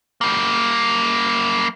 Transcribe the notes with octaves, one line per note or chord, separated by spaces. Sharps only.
G3 A#3